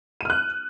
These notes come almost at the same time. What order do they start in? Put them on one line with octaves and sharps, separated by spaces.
D#7 F6 F#6